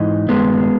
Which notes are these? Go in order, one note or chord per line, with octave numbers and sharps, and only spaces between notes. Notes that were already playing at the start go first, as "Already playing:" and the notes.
Already playing: G#2 E3 D#4
G2 D#3 G#3 B3